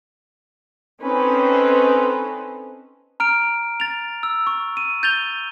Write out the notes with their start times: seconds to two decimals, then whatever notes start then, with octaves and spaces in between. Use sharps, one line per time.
1.03 C4 C#4 D#4 A4 B4 C5
3.20 A#5 F6 D7
3.80 A6 F7
4.23 E6
4.47 C#6
4.77 D#7
5.03 G6 A6 F7 G7